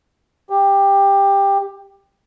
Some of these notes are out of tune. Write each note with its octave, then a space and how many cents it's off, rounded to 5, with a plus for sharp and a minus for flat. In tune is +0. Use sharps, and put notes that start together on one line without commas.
G4 +15